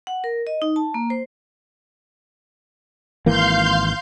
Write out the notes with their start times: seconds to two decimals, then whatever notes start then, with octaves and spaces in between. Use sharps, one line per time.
0.07 F#5
0.24 A#4
0.47 D#5
0.62 D#4
0.76 A5
0.94 A#3
1.10 C5
3.26 G#1 E3 A#3 F5 C6 G6